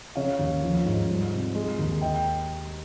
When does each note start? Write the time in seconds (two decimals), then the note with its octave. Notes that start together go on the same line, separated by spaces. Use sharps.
0.15 C#3 C#5 F5
0.39 D#2
0.62 F3
0.85 G#2
1.08 G3
1.33 C3
1.55 G#3
1.79 D#2
2.01 D#5 G5